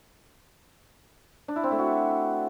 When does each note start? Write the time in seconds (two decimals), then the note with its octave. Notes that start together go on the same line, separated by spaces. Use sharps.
1.48 D4
1.56 E4
1.63 C4
1.71 A3
1.79 F#4